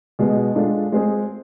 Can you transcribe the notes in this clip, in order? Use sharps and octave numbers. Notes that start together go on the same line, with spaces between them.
B2 G#3 B3
G#3 D4 F4 A4
G#3 C4 G#4